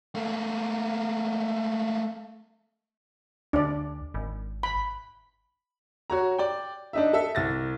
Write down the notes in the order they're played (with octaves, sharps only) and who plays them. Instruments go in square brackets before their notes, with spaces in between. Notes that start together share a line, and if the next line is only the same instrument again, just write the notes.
[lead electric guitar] A3 A#3
[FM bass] D2 [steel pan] D4 D5
[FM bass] G#1
[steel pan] B5
[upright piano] F#4 C#5 A#5
D5 G5
D4 D#4 E5
A4 E5
C2 A6 A#6